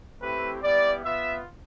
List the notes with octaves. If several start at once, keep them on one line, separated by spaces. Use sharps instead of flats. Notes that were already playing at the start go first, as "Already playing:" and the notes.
A3 C4 E4 G4 B4
G3 B3 E4 D5
B3 F4 E5